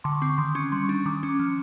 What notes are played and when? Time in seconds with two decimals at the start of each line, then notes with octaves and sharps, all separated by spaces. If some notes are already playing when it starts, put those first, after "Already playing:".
0.04 D3 C6
0.13 C#6
0.22 C4 D6
0.30 C#6
0.38 D#3 C6
0.55 C#4 C#6
0.72 G3 C6
0.84 C#6
0.89 D4
0.95 C#6
1.06 D#3 D6
1.17 D6
1.23 C#4
1.29 D6
1.39 F3